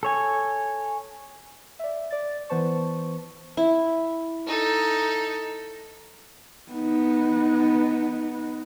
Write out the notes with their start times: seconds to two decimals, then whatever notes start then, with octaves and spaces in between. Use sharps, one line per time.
0.03 A4 C#5 G#5
1.79 D5 E5
2.11 D5 A6
2.49 E3 B3 B4 C5 A5 C#6
3.57 E4
4.47 D#4 A4
6.72 B3 D#4